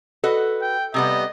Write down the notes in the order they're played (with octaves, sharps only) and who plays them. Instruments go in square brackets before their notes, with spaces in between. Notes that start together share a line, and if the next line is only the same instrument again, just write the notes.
[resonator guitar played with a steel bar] F#4 B4 D#5 [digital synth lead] A4
[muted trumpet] G5
[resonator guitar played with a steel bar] C3 G3 B3 [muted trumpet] D#5